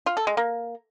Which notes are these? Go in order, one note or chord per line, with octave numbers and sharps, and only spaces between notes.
F4
A4
G#3
A#3